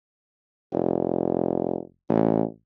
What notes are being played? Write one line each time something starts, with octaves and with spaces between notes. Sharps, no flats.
F1
A1